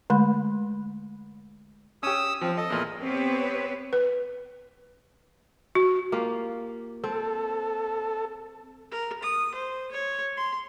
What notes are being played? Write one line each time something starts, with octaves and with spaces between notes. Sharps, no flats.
D3 G#3 A3 B5
C#4 G4 D#6 E6
F3 C4
A4 D#5
E2 A#2
B3 C4 G4 B4 C#5
B4
F#4
A#3 F4 G4
C4 A4
A#4
D#6
C5
C#5
C6